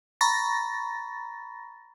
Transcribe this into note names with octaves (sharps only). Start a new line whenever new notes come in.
A#5 B5 C#6 A6 A#6